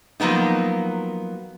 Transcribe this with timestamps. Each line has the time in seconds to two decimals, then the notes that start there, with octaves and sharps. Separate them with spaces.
0.20 F3 F#3 A#3 B3 D#4